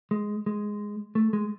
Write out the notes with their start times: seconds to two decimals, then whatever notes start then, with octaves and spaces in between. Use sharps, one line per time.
0.11 G#3
0.46 G#3
1.15 A3
1.33 G#3